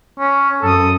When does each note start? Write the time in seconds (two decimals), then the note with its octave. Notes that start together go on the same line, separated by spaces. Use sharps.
0.20 C#4
0.62 F#2 A4 D#6